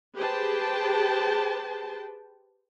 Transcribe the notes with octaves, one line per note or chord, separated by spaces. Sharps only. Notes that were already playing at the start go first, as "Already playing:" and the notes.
G4 G#4 B4 C5 G5 A5